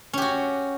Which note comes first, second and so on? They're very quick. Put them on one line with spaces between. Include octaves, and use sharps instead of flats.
C#4 G4 F#4